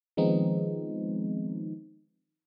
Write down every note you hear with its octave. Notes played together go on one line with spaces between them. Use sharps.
D#3 F3 G#3 B3 C4 D#4